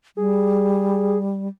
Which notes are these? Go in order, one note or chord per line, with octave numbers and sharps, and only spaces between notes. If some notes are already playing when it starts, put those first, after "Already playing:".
G3 G#4